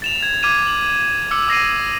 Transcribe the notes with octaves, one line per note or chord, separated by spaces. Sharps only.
A6 E7 F7
G#6
D6 F6 G#6 D#7 E7
F#7
D6 E6 F6 C#7
D#6 A#6 C7 D#7